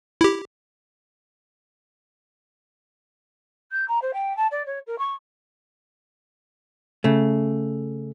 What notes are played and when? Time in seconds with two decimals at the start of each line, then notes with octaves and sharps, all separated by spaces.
0.21 E4 G4
3.71 G6
3.88 A#5
4.02 C5
4.13 G5
4.37 A5
4.51 D5
4.66 C#5
4.87 A#4
4.98 C#6
7.04 C#3 A3